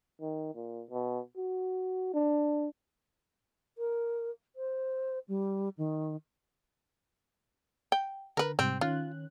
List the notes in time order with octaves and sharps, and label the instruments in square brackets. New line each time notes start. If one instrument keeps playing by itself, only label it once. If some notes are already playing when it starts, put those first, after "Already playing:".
[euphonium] D#3
A#2
B2
F#4
D4
[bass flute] A#4
C5
G3
D#3
[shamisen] G5
[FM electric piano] D3 [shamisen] A#4 B4
[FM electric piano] G#2 C3 G3 [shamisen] C4
[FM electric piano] D#3 C#4 F#6 [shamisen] F4